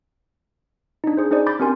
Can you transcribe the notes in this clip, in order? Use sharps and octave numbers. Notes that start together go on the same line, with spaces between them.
D4 D#4
D4 G#4 C5
C#4 D#4 G#4 C5 D5
B5 D6 G6 A6
C4 D4 G4 A#4 G#5 C6